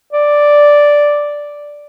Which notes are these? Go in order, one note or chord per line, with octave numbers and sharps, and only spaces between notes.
D5